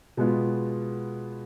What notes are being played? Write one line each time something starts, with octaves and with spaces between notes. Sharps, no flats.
B2 G#3 B3 F4